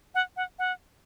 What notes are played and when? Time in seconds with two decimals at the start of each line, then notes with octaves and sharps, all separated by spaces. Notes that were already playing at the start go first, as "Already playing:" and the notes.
0.15 F#5
0.37 F#5
0.59 F#5